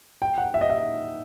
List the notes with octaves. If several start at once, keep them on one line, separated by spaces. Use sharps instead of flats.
G5
F#5
E5
D#5
E5